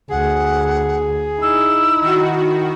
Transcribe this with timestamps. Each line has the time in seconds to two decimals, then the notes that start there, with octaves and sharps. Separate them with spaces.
0.10 D2 G#4 F#5
1.41 D#4 E4 E6
2.01 D#3 F#4